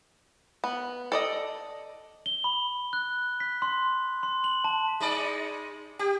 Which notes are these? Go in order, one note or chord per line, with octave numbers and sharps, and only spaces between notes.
B3
A4 D5 D#5
G7
B5
F#6
B6
C6
C6
F#7
A5
G#3 D#4 D5
G4